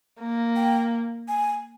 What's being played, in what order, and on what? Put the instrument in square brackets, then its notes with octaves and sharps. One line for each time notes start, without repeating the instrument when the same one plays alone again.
[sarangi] A#3
[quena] G5
G#5